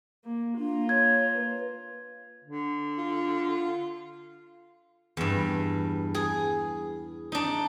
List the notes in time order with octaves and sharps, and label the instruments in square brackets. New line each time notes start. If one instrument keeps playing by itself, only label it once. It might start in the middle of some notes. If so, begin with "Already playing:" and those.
[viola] A#3
[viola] A#3 F4 [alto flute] D4
[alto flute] C#5 [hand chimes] G#6
[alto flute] B4
[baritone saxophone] D3
[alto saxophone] F4
[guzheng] E2 G2
G#4
D4 D#4